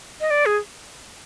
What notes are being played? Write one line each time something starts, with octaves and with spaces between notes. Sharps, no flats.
D#5
D5
G#4